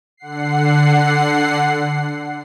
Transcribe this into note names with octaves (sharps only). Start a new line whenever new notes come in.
D3 F#5 C7